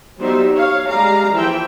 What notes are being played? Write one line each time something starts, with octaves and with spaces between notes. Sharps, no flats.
F#3 G3 B3 D#4 C5 E5
C#5 F5
G3 G#3 F5 A#5
E3 F3 E5 G5